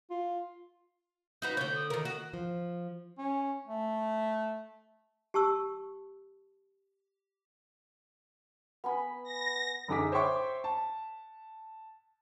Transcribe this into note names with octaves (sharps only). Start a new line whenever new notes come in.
F4
D#4 F#4 B4 G6
D3 C#5 G6
D#6
D#3 A#4
F#4
F3
C#4
A3
G4 A5 C#6 E6
B3 G#5 B5
A#6
F#2 D3 D#4 G#4 D6 B6
C5 C#5 E5 G5 C#6 D6
A5